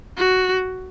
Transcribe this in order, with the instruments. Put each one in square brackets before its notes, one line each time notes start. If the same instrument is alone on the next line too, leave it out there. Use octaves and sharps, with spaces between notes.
[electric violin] F#4